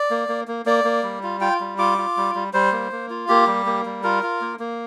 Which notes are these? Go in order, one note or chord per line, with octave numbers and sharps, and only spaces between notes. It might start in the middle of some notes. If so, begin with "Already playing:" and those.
Already playing: D5
A#3
A#3
A#3
A#3 D5
A#3
G3
F4
F4 G5
G3
F4 D6
F4
G3
G3
G3 C5
A#3
A#3
F4
A#3 G4
G3
A#3
G3
F4 A#4
F4
A#3
A#3